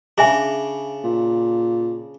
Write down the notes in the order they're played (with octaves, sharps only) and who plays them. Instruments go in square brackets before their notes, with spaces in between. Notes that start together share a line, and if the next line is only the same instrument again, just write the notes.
[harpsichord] C#3 D4 [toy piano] G#4 E5 G#5
[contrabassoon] A#2